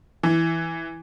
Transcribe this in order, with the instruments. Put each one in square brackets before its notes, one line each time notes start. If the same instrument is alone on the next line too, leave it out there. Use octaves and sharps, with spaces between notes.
[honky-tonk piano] E3